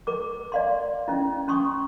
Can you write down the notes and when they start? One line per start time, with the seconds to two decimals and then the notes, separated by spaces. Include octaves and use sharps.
0.07 A#4 D6
0.52 D5 F5 C6
1.08 C#4 E4
1.48 C#4 C6 C#6 D#6